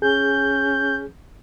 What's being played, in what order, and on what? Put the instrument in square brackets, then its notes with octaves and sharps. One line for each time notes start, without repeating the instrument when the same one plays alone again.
[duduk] C#4 [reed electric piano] G#4 [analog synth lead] G6